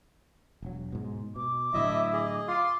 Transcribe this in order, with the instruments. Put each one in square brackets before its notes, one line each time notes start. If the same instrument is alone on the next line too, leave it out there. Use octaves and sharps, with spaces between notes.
[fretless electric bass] E1 F#3
G#2 B2
[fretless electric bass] B2 [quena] D6
[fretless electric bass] A2 D3 F#3 [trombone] E4 [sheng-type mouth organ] D#5 E5
[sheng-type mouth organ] G#4 D#5
[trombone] F4 [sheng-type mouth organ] C6 [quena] D6